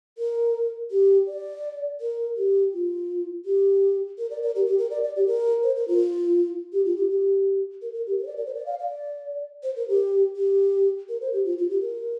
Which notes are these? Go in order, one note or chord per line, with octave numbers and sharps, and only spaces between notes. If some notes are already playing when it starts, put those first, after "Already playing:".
A#4
G4
D5
A#4
G4
F4
G4
A#4
D5
A#4
G4
G4
A#4
D5
D5
G4
A#4
C5
A#4
F4
G4
F4
G4
G4
A#4
A#4
G4
A#4
C5
D5
A#4
C5
D5
F5
D5
C5
A#4
G4
G4
A#4
C5
G4
F4
F4
G4
A#4